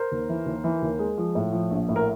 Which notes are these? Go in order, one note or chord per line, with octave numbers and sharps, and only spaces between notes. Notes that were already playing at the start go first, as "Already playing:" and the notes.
Already playing: A#4 C5
D#2
E3
D#2
E3
D#2
G#3
F3
A2
F3
A#1
A2
A#4